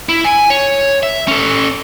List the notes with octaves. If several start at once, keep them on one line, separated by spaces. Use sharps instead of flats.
E4
G#5
C#5
E5
C#4 A4